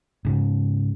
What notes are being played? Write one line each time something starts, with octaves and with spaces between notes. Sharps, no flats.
G#2 C#3